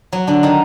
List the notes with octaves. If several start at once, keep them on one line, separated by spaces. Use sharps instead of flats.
F#3 F#4
D3 D4
D#3 D#4